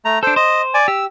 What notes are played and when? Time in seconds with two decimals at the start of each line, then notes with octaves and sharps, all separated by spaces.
0.05 A3 A#5
0.23 D4 A4 C5
0.36 C5 D#5
0.74 D5 G#5
0.88 G4 E6